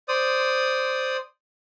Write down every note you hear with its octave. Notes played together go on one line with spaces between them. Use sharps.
C5 D5 D#6